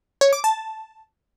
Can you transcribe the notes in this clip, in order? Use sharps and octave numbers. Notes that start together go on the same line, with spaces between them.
C#5
D6
A5